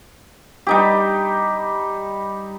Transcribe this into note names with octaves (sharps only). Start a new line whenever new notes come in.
G3 D#4 G4